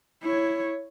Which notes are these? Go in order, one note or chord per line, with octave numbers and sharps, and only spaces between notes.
E4 C#5